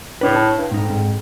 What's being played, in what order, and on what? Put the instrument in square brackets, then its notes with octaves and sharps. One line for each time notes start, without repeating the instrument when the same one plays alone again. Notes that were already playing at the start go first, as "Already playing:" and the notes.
[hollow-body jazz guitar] C#2 D4 B4 [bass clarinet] A2
[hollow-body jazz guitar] A5
[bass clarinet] G2
[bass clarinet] F2 [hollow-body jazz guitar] G#2 D#4
[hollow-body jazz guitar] G#2